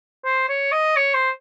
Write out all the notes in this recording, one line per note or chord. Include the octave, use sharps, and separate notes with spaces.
C5
C#5
D#5
C#5
C5